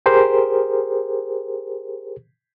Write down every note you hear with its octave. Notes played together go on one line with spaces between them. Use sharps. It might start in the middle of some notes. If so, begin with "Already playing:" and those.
G4 G#4 A#4 C5